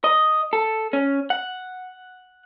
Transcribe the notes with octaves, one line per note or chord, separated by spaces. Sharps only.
D#5
A4
C#4
F#5